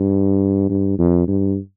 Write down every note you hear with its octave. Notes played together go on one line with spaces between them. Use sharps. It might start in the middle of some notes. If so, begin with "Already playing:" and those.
Already playing: G2
G2
F2
G2